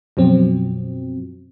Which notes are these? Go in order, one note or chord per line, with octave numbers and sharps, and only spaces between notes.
F#2 B2 F3 F#3 C4